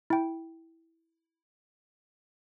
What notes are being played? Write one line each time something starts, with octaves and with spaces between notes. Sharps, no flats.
E4 G5